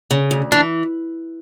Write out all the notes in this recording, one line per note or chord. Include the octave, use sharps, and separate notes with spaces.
C#3
D2
E3 D4